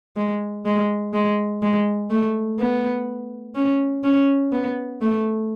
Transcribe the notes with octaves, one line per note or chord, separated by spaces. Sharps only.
G#3
G#3
G#3
G#3
A3
B3
C#4
C#4
B3
A3